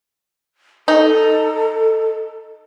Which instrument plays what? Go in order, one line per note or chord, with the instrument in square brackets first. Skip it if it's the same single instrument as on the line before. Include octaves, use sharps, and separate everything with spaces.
[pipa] D#4 [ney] A4